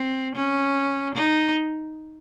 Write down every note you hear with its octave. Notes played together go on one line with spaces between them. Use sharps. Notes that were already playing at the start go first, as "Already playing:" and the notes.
Already playing: C4
C#4
D#4